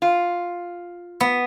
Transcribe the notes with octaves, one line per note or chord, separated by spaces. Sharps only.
F4
B3